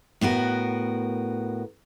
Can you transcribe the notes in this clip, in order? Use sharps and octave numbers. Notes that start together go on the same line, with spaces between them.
A2 B3 F#4 A#4